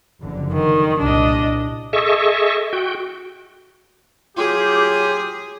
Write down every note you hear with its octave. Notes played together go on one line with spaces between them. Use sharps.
F#1 F2 D3
D#3
C2 A#2 D4 D#5
G#4 A4 D#5 E5 C#6
F#4 G5
F#3 F4 G4 G#4